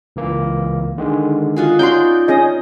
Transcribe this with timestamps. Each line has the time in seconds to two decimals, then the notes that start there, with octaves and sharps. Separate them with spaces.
0.16 C#2 E3 A#3
0.98 D3 D#3 G#3
1.56 F4 F#4 G#4
1.79 C#4 D#4 F#4 A#4 D5 C6 G6
2.28 C#4 G#4 D#5